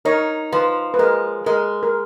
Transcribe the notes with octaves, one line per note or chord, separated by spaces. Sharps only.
D#4 A#4 C#5
F3 B4
B4
G#3 A#4
G#3 A#4
A#4